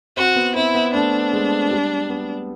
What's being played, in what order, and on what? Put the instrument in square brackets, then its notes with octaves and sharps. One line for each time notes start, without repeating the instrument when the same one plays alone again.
[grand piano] C4 [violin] F#4
[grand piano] B3
[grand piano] C4 [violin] E4
[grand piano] B3
[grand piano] A3 [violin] D4
[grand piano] G#3
G3
B3